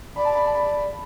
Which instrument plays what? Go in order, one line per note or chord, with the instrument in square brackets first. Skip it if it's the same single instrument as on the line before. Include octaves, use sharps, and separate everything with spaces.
[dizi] D5 [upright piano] B5
[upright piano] A5
B5
A5
B5